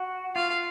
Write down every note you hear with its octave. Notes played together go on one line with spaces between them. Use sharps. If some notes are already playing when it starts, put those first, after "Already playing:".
Already playing: F#4
F4 F5